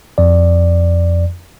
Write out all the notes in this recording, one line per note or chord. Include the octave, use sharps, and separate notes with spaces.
F2 D5